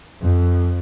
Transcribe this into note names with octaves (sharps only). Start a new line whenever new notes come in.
F2